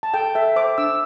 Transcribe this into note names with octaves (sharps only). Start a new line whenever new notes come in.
A5
A4 G5
A4 E5
C5 D6
D4 E6